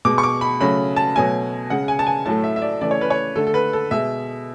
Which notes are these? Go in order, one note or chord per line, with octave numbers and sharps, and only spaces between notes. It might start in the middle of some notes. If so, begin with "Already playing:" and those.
B2 G#3 D6
C#6
D6
B5
C#3 F#3 A3 B5
A5
B2 F#3 A3 G#5
C#3 G#3 F#5
G#5
A5
G#5
A2 F#3 A3 A5
E5
E5
D5
C#3 E3 A3 D5
C#5
B4
C#5
D3 A3 A4
A4
B4
A4
B2 G#3 E5